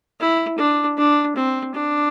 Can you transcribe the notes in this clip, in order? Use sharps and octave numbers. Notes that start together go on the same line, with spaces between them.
E4
D4
D4
C4
D4